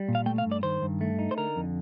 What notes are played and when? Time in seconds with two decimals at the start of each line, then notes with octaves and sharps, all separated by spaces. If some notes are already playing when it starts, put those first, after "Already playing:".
Already playing: G3
0.08 A#2
0.15 F5
0.26 A3 G5
0.38 F5
0.46 G2
0.52 D5
0.63 D#3 C5
0.82 G2
1.01 A3
1.19 D#4
1.31 C5
1.37 D3 A#4
1.56 F2